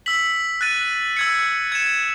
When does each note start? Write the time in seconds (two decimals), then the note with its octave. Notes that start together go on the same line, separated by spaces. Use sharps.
0.06 E6 B6 F#7
0.61 F#6 A6 D#7
1.17 E6 G#6 C#7
1.72 G#6 C#7 E7